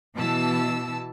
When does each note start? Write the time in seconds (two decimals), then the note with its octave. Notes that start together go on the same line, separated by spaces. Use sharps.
0.16 B2 E3 A5 E6